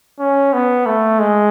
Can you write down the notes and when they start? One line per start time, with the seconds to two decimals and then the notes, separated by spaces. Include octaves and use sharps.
0.19 C#4
0.53 B3
0.86 A3
1.20 G#3